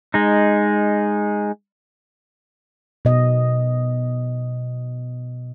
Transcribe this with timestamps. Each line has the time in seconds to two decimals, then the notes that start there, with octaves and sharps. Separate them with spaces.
0.14 G#3 D#4
3.05 B2 D#5